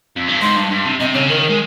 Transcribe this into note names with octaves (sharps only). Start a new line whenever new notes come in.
F2
G2
G#2 C6
G2
G2
C3
C3 D#5
C#3 C#5
D#3 A#4
G#3